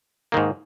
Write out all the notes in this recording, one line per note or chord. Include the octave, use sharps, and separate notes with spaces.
G#2 D#3 A#3